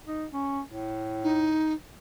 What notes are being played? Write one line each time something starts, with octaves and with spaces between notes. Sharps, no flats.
D#4
C#4
A2
D#4